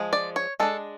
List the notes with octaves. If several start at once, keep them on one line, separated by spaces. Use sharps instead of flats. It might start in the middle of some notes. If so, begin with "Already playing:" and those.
Already playing: F3 G#3
D5
C#5
G#3 D4 A4